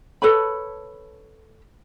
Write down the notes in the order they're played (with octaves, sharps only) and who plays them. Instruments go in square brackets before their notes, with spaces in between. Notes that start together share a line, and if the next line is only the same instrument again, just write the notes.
[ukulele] A4 B4 C#5 B5